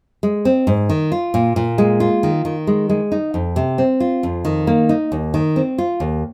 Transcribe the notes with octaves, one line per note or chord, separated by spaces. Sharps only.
G#3
C4
G#2
D#3
F4
A#2
A#2
G#3
F4
D#3
D#3
G#3
G#3
D#4
F2
C3
C4
F4
F2
D#3
A#3
D#4
D#2
D#3
C4
F4
D#2